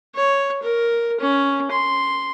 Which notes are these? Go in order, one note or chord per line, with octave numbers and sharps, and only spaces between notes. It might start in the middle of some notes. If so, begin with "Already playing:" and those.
C#5
A#4
C#4
C6